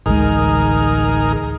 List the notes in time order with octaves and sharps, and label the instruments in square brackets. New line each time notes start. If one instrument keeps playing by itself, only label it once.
[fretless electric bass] A1 D2 G#3 [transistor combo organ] D#4 G#4 A#4